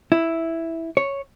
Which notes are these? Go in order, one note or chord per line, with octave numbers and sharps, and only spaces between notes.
E4
C#5